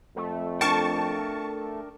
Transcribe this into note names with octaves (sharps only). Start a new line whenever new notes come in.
F2 A3
D4 A#4 G5 A5 C#6